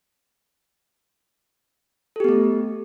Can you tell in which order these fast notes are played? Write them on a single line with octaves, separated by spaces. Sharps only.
A4 G4 B3 A3